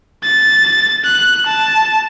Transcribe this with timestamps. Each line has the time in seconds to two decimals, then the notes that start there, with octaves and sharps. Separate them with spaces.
0.24 A6
1.04 F#6
1.46 A5